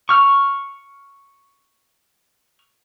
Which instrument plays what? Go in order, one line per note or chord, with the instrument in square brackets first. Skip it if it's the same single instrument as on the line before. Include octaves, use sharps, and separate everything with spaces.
[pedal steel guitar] C#6 F6